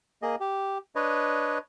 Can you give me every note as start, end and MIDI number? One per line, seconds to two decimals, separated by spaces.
0.22 0.35 58
0.22 0.35 68
0.22 0.35 75
0.40 0.78 67
0.96 1.58 62
0.96 1.58 71
0.96 1.58 73
0.96 1.58 75